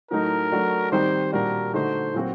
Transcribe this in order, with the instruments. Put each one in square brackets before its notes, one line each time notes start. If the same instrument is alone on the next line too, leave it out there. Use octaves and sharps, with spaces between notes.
[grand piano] A2 F#3 A3 D#4 [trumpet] A#4
[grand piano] F#3 A3 D4 F#4
[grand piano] D#3 G3 C4 D#4 [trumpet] C5
[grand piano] A#2 G3 D4 F#4 [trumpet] A#4
[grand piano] D3 A3 D#4 F#4 [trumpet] C5
[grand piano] A#2 F#3 C4 F#4